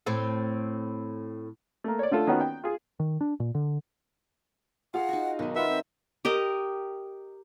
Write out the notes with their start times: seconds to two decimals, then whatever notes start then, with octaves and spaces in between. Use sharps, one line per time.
0.06 A2 C4 A4
1.84 A3 A#3
1.99 C#5 D5
2.11 D3 A3 F4 A4
2.27 D#3 A#3 B3 C#4 F#4
2.41 G5
2.64 F4 G#4
3.00 D#3
3.21 D4
3.40 A#2
3.55 D3
4.94 F4 G#4 F5 F#5
5.09 D#4 F#4
5.39 B1 D#3 G#3
5.56 F4 B4 E5 F#5 B5
5.69 C4
6.25 G4 A#4 D#5